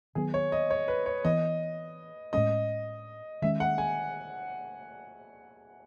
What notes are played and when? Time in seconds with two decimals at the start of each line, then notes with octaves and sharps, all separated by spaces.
0.15 D#3 F#3 B3 G#4
0.34 C#5
0.52 D#5
0.71 C#5
0.88 B4
1.06 C#5
1.24 E3 B3 D#5
2.33 A2 G#3 C#4 D#5
3.42 D#3 G#3 C#4 E5
3.60 F#5
3.78 G#5